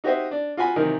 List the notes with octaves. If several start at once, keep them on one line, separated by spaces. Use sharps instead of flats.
D#4 F#4 G4 C5 D#5 E5
D4
F4 F#4 F#5 G#5 B5
C3 D#3 E3 F#3 D#4 A#4